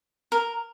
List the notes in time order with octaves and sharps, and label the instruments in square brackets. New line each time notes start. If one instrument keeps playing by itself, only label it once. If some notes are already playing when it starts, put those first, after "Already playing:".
[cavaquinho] A#4